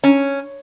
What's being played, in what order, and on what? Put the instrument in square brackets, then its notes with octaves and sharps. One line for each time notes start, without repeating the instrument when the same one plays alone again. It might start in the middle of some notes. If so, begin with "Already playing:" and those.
[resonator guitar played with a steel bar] C#4